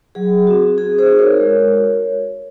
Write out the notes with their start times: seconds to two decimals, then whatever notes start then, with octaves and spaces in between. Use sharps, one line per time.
0.15 F#3 G#4
0.47 C4 F#4
0.78 C4 G#4
0.98 G#4 C5
1.09 D#4 F#4
1.19 A#4 C#5
1.40 G#3
1.72 F#4